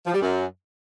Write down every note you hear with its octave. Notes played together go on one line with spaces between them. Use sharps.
F3
G3
F#2